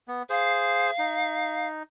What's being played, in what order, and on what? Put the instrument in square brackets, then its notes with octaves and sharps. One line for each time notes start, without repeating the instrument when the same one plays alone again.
[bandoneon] B3
[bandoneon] G#4 C5 [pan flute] F5
[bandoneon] D#4